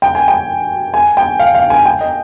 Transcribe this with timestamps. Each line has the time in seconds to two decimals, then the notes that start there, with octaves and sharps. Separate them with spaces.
0.02 G5
0.15 G#5
0.28 G5
0.94 G#5
1.17 G5
1.39 F5
1.55 F5
1.70 G#5
1.85 G5
2.01 D#5